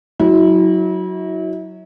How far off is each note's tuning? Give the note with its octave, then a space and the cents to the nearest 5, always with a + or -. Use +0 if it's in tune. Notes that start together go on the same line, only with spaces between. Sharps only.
F#3 +0 E4 -35